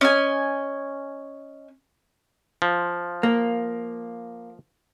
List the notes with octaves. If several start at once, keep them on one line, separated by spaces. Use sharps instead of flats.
C#4 D#5 G#5
F3
A#3